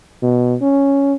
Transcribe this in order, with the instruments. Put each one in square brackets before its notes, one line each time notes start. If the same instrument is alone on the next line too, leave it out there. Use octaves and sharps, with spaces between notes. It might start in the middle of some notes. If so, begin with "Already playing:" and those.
[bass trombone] B2
C#4